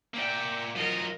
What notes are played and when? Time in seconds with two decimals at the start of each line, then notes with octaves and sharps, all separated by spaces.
0.14 A#3 D5 E5 G5
0.76 F#3 F4 A#4 D#5